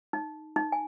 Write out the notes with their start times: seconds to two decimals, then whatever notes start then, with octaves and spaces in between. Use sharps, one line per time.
0.13 D#4
0.56 D#4
0.72 G#5